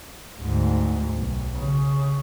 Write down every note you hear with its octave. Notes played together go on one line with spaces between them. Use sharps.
D2 G#2
B1
C#3